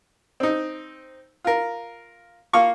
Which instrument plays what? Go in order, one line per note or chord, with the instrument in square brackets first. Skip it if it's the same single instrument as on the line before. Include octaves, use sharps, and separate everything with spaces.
[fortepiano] C4 D#4
F4 A#4
A#3 F4 C#6